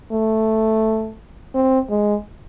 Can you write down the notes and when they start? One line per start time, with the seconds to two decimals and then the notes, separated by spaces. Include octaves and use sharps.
0.12 A3
1.54 C4
1.90 G#3